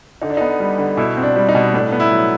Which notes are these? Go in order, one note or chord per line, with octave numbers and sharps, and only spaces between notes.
D3 D#4
D4
B3 D#4
G3
D3
B2 E4
C4
D4
G3
D#4
B2
A2 D4
B3
E4
F#3